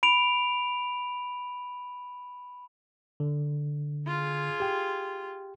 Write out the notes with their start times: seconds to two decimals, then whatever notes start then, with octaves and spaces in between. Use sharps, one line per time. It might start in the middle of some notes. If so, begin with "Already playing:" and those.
0.03 B5 D7 F7
3.20 D3
4.07 F4 G#4
4.60 G4 G5